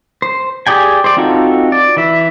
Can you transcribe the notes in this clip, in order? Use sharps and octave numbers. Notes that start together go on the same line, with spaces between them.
C5
G4 G#4 D5 G5 G#5
C5 D5
C4 D#4 F4 F#4 A4
D5
E3 E5